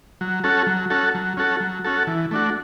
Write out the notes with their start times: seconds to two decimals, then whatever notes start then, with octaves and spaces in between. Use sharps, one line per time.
0.21 F#3
0.44 C#4 F#4 A4
0.67 F#3
0.90 C#4 F#4 A4
1.15 F#3
1.37 C#4 F#4 A4
1.60 F#3
1.84 C#4 F#4 A4
2.07 E3
2.31 A3 D4 F#4